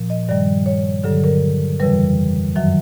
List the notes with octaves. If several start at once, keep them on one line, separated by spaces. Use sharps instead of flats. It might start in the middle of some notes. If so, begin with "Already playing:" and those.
Already playing: A#2 F3
D#5
G2 D#3 G3 D5
C#5
G2 D3 F#3 A4
A#4
F2 C#3 E3 G3 B4
F#2 D#3 F#3 E5